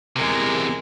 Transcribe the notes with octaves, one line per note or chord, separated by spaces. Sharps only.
E2 C3 G#3 A#4